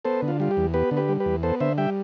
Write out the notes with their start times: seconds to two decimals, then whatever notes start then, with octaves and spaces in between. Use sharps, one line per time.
0.05 B3 A4 C5
0.22 D3
0.28 F4
0.40 G3 F4
0.51 G4
0.57 E2
0.74 B3 G4 B4
0.91 D3
0.97 G4 B4
1.09 G3
1.20 G4 B4
1.26 E2
1.43 B3 A4 C5
1.60 D3 C5 E5
1.78 G3 E5 G5